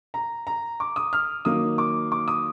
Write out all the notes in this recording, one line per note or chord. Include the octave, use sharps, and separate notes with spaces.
A#5
A#5
D6
D#6
F6
D#3 F#3 A#3 D#6
D6
D6
D#6